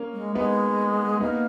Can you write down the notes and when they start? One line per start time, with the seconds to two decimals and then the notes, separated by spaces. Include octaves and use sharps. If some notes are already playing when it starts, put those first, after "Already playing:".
Already playing: A#3 C#4
0.13 G#3
0.35 G#3 B3 D#4
1.20 A#3 B3 D#4